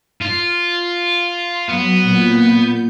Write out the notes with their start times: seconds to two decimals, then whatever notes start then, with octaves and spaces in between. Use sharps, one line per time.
0.22 F4
1.31 C6
1.69 F#3 B3 F#4
2.02 A#2 G6